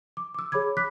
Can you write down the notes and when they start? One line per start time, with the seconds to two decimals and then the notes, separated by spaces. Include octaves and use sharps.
0.17 D6
0.34 D6 E6
0.52 G#4 C#5 B5 D6 G#6
0.77 B5 D6 F#6 B6